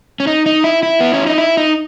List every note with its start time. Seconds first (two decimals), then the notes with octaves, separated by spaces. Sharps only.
0.20 C#4
0.27 D#4
0.46 D#4
0.64 E4
0.83 E4
1.00 B3
1.14 C#4
1.26 D#4
1.38 E4
1.57 D#4